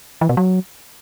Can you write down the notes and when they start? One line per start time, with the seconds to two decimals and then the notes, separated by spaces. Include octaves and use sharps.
0.21 E3
0.29 B2
0.37 F#3